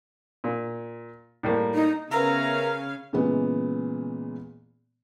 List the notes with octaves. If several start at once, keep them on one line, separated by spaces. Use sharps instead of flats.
A#2
A2 G3 A#3
D#4
C#3 B3 C#4 A#4 E5 F5 A#5
A#2 C#3 E3 G#3 B3